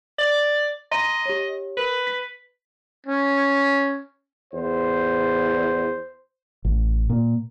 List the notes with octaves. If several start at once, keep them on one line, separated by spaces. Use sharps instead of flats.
D5
D#5 A#5 C6 D#7
G4 C#5
A#4 B4
B6
C#4
E2 C5
A1
A#2